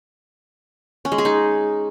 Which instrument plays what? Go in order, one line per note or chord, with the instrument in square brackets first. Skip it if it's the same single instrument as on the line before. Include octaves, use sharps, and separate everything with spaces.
[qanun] C#4
G#3
G#4
D#4